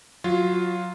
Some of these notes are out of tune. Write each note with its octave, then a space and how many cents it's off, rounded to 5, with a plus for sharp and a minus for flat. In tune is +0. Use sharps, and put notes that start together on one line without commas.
F#3 -15 F4 +0